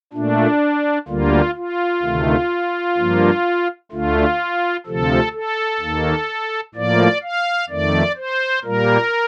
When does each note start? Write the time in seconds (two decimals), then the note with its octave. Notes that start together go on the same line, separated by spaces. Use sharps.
0.13 A#2 A3 D4
1.08 D2 D3 G3 A#3 F4
1.55 F4
2.02 D2 C3 D#3 A3
2.97 G2 F3 A#3
3.92 D2 D3 A3 F4
4.86 D2 C3 F3 A4
5.33 A4
5.80 D#2 D#3 A#3
6.75 A2 F3 A#3 D5
7.23 F5
7.69 F2 D#3 A3 D5
8.17 C5
8.64 A#2 G3 A#3 A#4